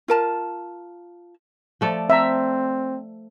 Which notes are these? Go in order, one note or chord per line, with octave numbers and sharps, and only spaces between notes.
F4 A#4 A5
F3 A3 D5
C4 E5 A#5